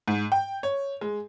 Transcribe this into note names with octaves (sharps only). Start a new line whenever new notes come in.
G#2
G5
C#5
G#3